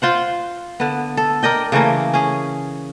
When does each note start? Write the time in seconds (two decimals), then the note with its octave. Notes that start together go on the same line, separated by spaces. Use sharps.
0.02 F4 C5 F#5
0.80 D3 B3
1.17 A4
1.43 A#4 D5 D#5 G5
1.72 C#3 E3 A3 A#3
2.14 C#4 G#4